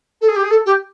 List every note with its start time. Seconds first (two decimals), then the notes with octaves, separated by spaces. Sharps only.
0.21 A4
0.28 G#4
0.36 G4
0.43 G#4
0.50 A4
0.65 G4